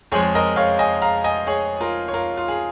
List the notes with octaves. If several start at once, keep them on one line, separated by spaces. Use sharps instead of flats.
F2 F3 G#3 G#4 C#5
A#4 D#5
C#5 F5
D#5 G#5
F5 A#5
D#5 G#5
G#4 C#5
F4 A#4
C#5
F4 A#4
F4
G#4